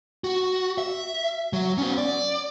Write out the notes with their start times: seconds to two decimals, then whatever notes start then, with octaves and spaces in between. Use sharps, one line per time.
0.24 F#4
0.78 E5
1.53 F#3
1.78 B3 C#4
1.98 D5